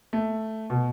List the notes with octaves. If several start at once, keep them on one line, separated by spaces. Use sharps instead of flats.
A3
B2